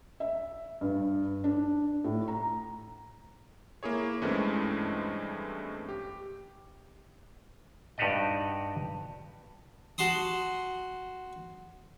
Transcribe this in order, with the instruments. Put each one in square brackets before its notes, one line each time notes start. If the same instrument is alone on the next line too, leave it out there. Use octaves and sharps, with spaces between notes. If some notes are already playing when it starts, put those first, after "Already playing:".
[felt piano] E5
G2
D4
A2
A#5
[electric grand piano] A#3 E4 G#4 C#5
G2 E3 G#3 A3 C4 C#4
G4
[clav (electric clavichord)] G2 D#4 F#4 G4 D5 D#5
[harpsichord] F#4 A5 C6 D#6